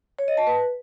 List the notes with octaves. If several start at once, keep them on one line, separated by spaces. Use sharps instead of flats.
C#5
D#5
A5
B4